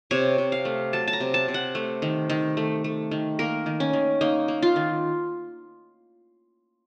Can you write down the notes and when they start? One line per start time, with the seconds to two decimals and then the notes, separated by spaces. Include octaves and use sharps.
0.11 C3 C#5
0.38 C3
0.52 F5
0.65 A3
0.93 F#3 A5
1.08 A5
1.13 A#5
1.20 C3
1.34 A5
1.48 C3
1.54 F#5
1.75 A3
2.02 D#3
2.30 D#3
2.57 A3
2.84 A3
3.11 D#3
3.39 A#3 A#4
3.66 D#3
3.80 C#4
3.93 D#3
4.21 A#3 D#4
4.48 A#3
4.62 F4
4.76 D#3